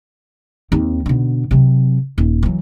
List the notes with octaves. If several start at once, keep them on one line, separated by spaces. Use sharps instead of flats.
D#2 C4
B2 D3
C3 F#3
D#1
E3 F#3